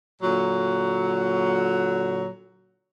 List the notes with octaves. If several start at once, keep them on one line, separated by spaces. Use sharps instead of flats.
A#2 D3 F#3